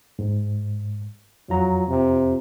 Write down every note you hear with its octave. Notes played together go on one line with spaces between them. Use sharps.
G#2
F2 F#3 F4 A#5
C3